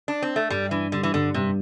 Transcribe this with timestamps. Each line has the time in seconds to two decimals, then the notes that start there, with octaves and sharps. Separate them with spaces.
0.08 D4
0.22 C4
0.36 A3
0.50 G2 G3
0.71 E3 D4
0.92 D3 G3
1.03 E3
1.14 G2 D3
1.34 G2 C3